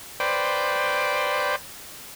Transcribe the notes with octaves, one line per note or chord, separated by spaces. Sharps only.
B4 C5 D5 G5